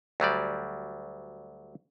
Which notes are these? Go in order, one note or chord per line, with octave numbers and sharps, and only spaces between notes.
D2 F#3 G3 D5